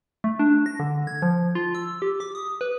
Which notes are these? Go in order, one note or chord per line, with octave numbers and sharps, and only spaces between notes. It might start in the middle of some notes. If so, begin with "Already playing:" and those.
A3
D4
A#6
D3
G#6
F3
F4
E6
G4
D6
D#6
B4